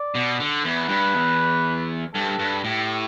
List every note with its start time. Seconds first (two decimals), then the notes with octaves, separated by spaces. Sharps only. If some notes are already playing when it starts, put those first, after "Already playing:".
Already playing: D5
0.15 B2
0.40 D3
0.65 E2 B4
0.89 G2
1.14 E2
2.14 G2 A4
2.39 G2
2.64 A2 G4